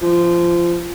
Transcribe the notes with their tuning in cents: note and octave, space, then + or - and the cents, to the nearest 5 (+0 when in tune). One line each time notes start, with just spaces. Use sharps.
F3 -20